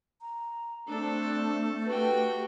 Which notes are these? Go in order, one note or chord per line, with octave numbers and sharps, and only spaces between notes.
A#5
A3 C4 D4 A4
F#4 G4 A4 B4 G5